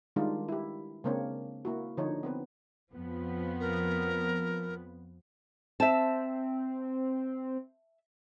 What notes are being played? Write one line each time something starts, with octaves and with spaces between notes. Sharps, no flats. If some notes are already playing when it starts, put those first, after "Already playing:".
D#3 G3 G#3 D4 D#4 F4
E4 G4
C#3 G#3 A#3 C4 D4 C#5
A#3 E4 F#4
D3 F3 D4 D#4 C#5
B3 C4 B4
F2 F3 B3
A#4
C4 E5 A5